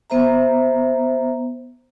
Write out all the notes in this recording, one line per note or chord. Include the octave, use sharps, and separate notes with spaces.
B3 C5 E5 A#5